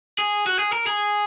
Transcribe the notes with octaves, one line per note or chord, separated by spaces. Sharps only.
G#4
F#4
G#4
A#4
G#4